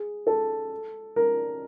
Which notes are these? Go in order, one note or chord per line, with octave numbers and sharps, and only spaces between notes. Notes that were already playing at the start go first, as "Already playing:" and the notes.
Already playing: G#4
A4
A#4